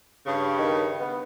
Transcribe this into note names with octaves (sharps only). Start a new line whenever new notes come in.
G2 C#3
D#3
B3